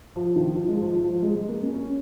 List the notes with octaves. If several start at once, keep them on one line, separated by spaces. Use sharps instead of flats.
F3
D#3
F3
G#3
F3
F3
F3
G#3
G#3
A#3
C#4
C#4